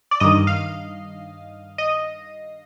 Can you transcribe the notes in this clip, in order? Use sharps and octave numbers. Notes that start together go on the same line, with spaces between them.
D5
G2 D#3 D#5
F5
D#5